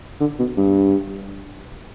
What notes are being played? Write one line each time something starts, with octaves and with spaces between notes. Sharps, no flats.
D3
B2
G2